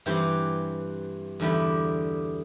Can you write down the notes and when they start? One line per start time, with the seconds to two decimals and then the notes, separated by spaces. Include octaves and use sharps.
0.06 G2 E3 C4 G4
1.40 E2 D3 G3 E4 G4